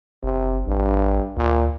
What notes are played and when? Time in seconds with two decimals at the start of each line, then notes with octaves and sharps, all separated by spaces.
0.23 F#1 C3
0.67 A1 G2
1.37 D2 A#2